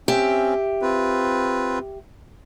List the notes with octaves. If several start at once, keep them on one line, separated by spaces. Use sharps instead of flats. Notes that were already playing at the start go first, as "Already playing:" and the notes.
C4 C#4 G4 E5
C4 F4 B4